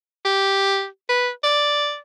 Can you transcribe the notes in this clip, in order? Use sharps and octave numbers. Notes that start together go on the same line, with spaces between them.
G4
B4
D5